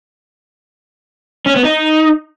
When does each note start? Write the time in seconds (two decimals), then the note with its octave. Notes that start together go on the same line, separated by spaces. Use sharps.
1.46 C#4
1.55 B3
1.65 D#4